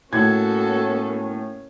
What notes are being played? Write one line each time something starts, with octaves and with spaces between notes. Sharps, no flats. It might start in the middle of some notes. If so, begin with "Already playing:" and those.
A2 A#3 C#4 F#4 A4 G#6